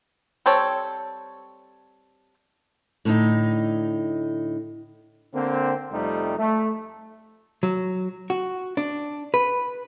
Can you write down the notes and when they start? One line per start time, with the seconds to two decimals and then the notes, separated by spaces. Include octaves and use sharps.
0.46 G3 C4 A4 C#5
3.05 A2 D3 D#4
5.34 D3 A#3 C4
5.92 F2 C3 G3 A3 D#4
6.38 A3
7.63 F#3
8.30 F#4
8.77 D4
9.34 B4